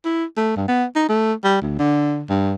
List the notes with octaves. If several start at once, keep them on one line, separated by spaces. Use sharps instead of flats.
E4
A3
G2
B3
D#4
A3
G3
D2
D3
G2